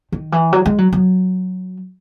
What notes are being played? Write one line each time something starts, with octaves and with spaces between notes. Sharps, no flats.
D#3
E3
F#3
G#3
F#3
F#3